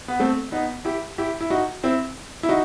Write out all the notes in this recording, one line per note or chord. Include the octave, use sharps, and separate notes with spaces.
B3
A3 C4
B3 D#4
E4 G4
E4 G4
E4
D#4 F#4
C4 E4
E4
D#4 F#4